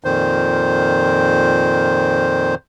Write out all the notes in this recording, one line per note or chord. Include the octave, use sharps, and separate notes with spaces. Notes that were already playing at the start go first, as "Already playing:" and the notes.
F2 A#2 D#3 C5